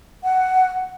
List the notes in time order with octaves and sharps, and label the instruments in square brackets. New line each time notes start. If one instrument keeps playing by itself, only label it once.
[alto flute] F#5